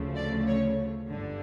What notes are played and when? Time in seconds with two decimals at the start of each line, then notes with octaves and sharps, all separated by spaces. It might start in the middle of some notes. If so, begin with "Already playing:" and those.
Already playing: D2 C#3 F3 A3
0.15 D5
0.47 C#5
1.09 G1 G2 D3